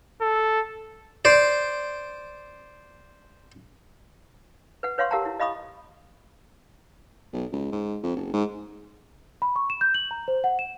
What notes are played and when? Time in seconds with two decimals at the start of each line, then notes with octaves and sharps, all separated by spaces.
0.22 A4
1.25 C5 D5
4.83 B4 F#5
4.98 B4 C#5 F5 F#5 C6 C#6
5.11 G4 A#4 F5 F#5 A5 A#5
5.25 E4
5.40 D#5 F5 B5 C#6 D#6
7.33 B1
7.52 C#2
7.72 G#2
8.03 F2
8.16 F#1
8.33 G#2
9.42 B5
9.56 C#6
9.70 E7
9.81 G6
9.95 F#7
10.11 A#5
10.28 C5
10.44 F#5
10.59 E7